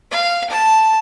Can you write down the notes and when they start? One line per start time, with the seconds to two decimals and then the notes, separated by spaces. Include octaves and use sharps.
0.11 F5
0.50 A5